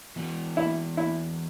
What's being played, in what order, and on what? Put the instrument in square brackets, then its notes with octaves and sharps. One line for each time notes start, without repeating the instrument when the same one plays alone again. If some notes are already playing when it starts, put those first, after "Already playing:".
[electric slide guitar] E3 B3 F#4
[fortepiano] E4
E4